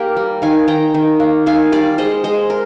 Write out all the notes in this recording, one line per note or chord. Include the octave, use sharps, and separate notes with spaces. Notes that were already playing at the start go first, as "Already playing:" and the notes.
Already playing: A#3 G4 A#4
G3
D#3 F5 G#5
D#3 G5 A#5
D#3
A#3
D#3 F5 G#5
G3 D5 F5
G#3 C5 D#5
G#3 C5 D#5
A#4